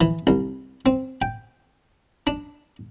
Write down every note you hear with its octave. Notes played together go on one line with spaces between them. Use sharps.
E3
C2
C4
G5
D4